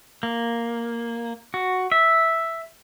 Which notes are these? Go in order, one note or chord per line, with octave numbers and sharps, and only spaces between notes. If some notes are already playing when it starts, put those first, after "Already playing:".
A#3
F#4
E5